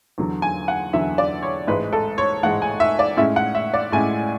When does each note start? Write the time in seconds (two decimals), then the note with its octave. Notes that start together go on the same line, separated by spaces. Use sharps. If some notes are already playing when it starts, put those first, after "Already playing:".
0.18 E2 D3 F#3
0.42 G#5
0.68 F#5
0.93 E2 D3 F#3 E5
1.18 D5
1.42 C#5
1.67 A1 G#2 G#3 B4
1.93 A4
2.18 C#5
2.43 A1 G#2 G#3 F#5
2.62 G#5
2.80 E5
2.99 D5
3.17 A2 G#3 C#4 E4 E5
3.36 F#5
3.55 E5
3.74 D5
3.92 A2 G#3 C#4 E4 G#5